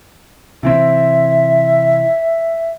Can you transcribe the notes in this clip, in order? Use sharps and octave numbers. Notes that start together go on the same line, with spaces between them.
C3 E3 C4 E5